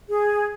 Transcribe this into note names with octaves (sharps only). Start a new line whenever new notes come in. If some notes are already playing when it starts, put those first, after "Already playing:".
G#4